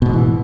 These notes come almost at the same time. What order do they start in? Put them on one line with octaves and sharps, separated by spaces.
B2 G#2 D#3 E3